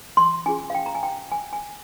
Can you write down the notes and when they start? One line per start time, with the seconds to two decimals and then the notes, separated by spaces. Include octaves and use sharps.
0.17 C6
0.46 C#4 F4 G#4 G#5
0.70 F5
0.75 G5
0.86 A#5
0.95 G#5
1.03 G5
1.32 G#5
1.53 G#5